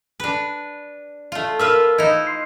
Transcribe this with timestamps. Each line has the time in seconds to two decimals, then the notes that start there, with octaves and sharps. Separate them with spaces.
0.20 D4 B4
1.32 A3 F4
1.59 F4 A#4 B4 E5 E6 F6
1.98 D#4 E4 D#5
2.27 C6 C7